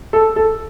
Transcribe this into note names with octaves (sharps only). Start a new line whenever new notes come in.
A4
A4